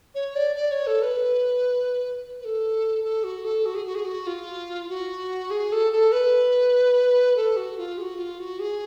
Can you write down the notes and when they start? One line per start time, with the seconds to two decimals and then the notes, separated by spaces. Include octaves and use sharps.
0.15 C#5
0.36 D5
0.56 D5
0.71 C#5
0.87 A4
1.02 B4
2.41 B4
2.45 A4
3.04 A4
3.24 F#4
3.45 A4
3.66 F#4
3.75 G#4
3.85 F#4
3.95 G#4
4.05 F#4
4.27 F4
4.89 F#4
5.51 G#4
5.72 A4
5.92 A4
6.12 B4
7.36 A4
7.57 F#4
7.78 F4
7.98 G#4
8.01 F#4
8.19 F4
8.39 F#4
8.60 G#4